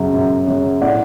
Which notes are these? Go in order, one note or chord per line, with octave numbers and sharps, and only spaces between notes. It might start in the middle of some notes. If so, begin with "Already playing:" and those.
Already playing: F#2 C#3 F#3
F#2
C#3 F#3
A2 D5 F#5